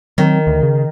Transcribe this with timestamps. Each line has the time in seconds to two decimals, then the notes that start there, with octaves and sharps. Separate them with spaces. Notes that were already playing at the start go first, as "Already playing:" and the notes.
0.18 D#3 F#3 C4
0.47 D2
0.63 C#3